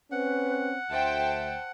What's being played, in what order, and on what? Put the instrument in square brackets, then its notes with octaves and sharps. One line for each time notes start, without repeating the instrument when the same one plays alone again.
[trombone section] C4 C#4 [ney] B4 [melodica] F#5
[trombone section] D2 [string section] C5 G5 A5 [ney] E5